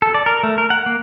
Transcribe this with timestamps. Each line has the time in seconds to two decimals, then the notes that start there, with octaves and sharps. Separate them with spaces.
0.02 A4
0.14 D5
0.26 A#4
0.43 A3
0.58 A#4
0.70 F#5
0.86 A#3